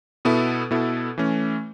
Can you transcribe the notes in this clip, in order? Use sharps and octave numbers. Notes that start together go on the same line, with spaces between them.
B2 B3 E4 A4
B2 B3 E4 A4
E3 A3 C#4